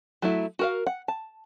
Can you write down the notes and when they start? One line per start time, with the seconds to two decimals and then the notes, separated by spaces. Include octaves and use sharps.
0.22 F#3 A3 E4
0.59 F#4 A#4 F5
0.87 F#5
1.08 A5